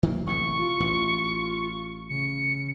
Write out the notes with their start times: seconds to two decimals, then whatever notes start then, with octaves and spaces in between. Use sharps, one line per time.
0.03 D#3 F#3 A#3
0.27 A1 C3 E3 C#6
0.58 F4
0.80 A1 E3
2.10 C#3 C#7